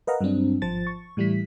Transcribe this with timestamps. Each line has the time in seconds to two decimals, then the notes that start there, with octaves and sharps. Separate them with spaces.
0.07 A#4 B4 D#5 F5 F#5 A#5
0.21 G2 F#3 G3 C4 D4
0.62 G#1 F3 C5 A5 A6
0.87 C#6
1.17 A2 E3 G3 E4 B6